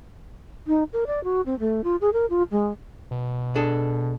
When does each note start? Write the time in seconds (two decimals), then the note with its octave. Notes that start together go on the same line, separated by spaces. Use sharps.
0.67 D#4
0.93 A#4
1.07 D5
1.24 F#4
1.46 C4
1.59 A3
1.84 F4
2.01 G#4
2.13 A#4
2.30 F4
2.51 G#3
3.11 B2
3.56 D4 G#4 A4